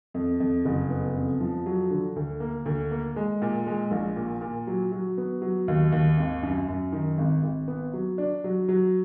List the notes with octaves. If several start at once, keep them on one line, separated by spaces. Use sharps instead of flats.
F2
F2
F#1
B3
F2
F3
F#3
D3
D2
A#3
D2
A#3
G#3
A#2
G#3
A#1
A#2
A#2
F#3
F#3
B3
F#3
D#2
D#2
G#1
F#2
F#2
D#3
G#1
G#1
B3
F#3
D4
F#3
F#3